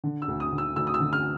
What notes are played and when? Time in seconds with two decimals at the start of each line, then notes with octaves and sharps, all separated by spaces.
0.04 D3
0.22 E6
0.28 D2
0.40 D#6
0.52 D2
0.58 E6
0.76 D2 E6
0.87 D#6
0.94 E6
1.00 D3
1.13 F6